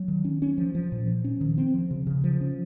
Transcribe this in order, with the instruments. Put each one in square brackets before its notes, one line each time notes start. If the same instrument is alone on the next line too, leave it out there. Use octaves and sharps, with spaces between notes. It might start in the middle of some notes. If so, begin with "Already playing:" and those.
Already playing: [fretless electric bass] F#3
D#3
C#4
C#4
F3
F3
A#2
F3
C#4
D#3
C4
F3
C#3
C#3
F3
C#4